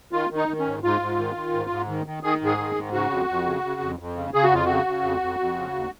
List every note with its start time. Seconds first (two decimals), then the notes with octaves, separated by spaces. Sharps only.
0.13 D#3 F4
0.30 D#3
0.36 D#4
0.48 D#3
0.59 C#4
0.66 G#2
0.83 G#2 F4
1.01 G#2
1.18 D#3
1.35 D#3
1.54 G#2
1.70 G#2
1.88 D#3
2.06 D#3
2.23 D#3 G#4
2.41 G#2 G#4
2.58 D#3
2.75 G#2
2.93 C#3 F#4
3.10 F2
3.29 F2
3.46 C#3
3.64 C#3
3.81 F2
3.99 F2
4.16 C#3
4.34 C#3 G#4
4.44 F#4
4.51 F2 F4
4.65 C#3 F#4
4.86 C#3
5.03 F2
5.21 F2
5.39 F2
5.56 C#3
5.74 D#2